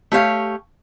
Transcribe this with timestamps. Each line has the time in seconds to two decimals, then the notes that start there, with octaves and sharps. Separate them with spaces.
0.12 A3 G4 C#5 F5